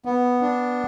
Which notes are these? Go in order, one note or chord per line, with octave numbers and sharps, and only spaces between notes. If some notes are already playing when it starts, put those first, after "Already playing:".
B3
D4